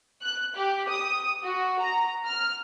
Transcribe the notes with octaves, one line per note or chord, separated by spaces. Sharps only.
F#6
G4
D#6
F#4
A#5
F6